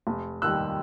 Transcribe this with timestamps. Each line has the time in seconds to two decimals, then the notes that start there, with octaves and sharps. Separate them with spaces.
0.07 F1
0.42 D#2 D#3 G3 E6 F#6